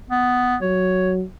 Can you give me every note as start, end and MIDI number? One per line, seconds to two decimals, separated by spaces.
0.10 0.56 59
0.62 1.23 54
0.62 1.12 73